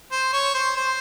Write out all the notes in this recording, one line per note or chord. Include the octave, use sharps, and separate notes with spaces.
C5
C#5
C5
C5